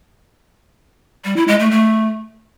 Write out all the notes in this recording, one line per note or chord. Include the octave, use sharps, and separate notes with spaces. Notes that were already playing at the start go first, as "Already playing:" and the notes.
G3
E4
G#3
A3
A3